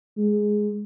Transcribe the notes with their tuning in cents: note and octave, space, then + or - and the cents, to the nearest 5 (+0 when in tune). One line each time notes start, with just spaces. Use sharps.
G#3 +5